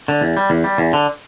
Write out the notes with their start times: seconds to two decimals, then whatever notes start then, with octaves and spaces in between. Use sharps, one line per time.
0.08 D3
0.21 E2
0.37 G3
0.50 E2
0.64 G3
0.78 E2
0.93 D3